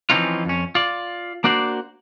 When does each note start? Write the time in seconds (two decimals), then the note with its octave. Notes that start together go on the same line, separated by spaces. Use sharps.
0.10 E3 F3 C4 C#4 D#4 F4
0.45 F2 C#4
0.75 F4 D5
1.44 A#3 D4 F#4 C5 D5